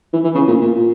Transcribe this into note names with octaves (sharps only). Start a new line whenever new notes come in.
E3
E3
C#3
A#2
A#2
A#2